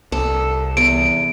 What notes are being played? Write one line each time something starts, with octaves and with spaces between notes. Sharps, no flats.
C2 A4
E2 D7